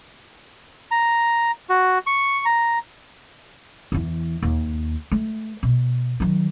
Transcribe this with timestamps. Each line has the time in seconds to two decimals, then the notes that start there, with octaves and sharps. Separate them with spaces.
0.91 A#5
1.70 F#4
2.07 C#6
2.45 A#5
3.92 E2 E3
4.43 D#2
5.12 A3
5.63 B2
6.20 D#3 F#3